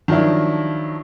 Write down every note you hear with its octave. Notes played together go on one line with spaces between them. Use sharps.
D#3 F3 F#3 D4 E4